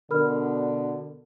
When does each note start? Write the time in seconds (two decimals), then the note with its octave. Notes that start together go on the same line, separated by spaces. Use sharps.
0.11 B2 D3 A#4 B5 F6